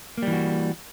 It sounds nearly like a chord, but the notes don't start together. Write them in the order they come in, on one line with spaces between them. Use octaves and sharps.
A#3 G3 E3 F#4